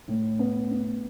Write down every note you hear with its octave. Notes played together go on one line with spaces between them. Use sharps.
A2
B3
B3